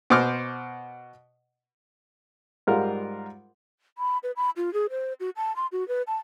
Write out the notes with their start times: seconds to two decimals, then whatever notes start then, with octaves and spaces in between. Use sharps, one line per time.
0.10 B2 C5 D6 F6
2.67 G#2 G3 F4 A#4 F#5
3.98 B5
4.23 B4
4.36 B5
4.57 F4
4.73 G#4
4.90 C5
5.20 F#4
5.36 A5
5.56 C6
5.72 F#4
5.88 B4
6.07 A5